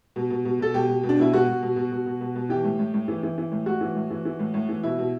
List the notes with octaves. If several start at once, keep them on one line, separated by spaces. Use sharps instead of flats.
B2
B2
B2
B2 A4
B2 G4
B2
B2
D4
B2 E4
B2 F#4
B2
B2
B2
B2
B2
B2
B2
E3 G4
A2
A2
A2
E3
E3
E3
A2
A2 F#4
E3
A2
E3
E3
A2
A2
E3
B2 E4
B2